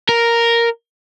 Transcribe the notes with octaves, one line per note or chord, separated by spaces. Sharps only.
A#4